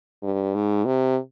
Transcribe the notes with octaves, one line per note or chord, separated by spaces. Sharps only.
G2
G#2
C3